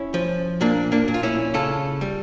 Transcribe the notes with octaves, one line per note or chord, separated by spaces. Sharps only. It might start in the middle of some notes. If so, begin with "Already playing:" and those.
Already playing: C#4 E4
F3
A#2 A#3 D4
A#3 D4
A#2
F4
C#4 E4
C#3 F4 A4
G3